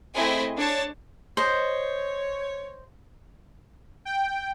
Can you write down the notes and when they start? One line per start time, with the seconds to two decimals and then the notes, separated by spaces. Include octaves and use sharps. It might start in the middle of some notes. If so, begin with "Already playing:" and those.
0.15 A3 C4 E4 G#4 D#5 G#5
0.57 D4 C#5 A5
1.37 C5 C#5 D#5
4.05 G5